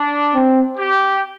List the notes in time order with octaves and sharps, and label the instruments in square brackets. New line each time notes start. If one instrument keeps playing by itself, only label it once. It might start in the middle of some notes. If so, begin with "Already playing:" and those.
Already playing: [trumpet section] D4
[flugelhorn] C4
[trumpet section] G4